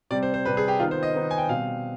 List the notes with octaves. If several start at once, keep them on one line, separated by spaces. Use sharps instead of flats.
C3 G3 C4 D5
C5
C5
C3 G3 C4 B4
G#4
G4
D#3 B3 D#4 F4
C5
D#5
D#3 B3 D#4
G#5
G5
B2 G3 C4 F5